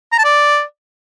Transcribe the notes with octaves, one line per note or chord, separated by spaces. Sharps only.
A#5
A5
D5